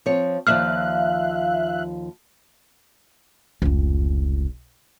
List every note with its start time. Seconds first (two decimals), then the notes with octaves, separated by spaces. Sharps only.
0.06 F3 C4 C#5
0.47 D#2 F3 D5 E5 F5 F6 F#6
3.62 F1 C#2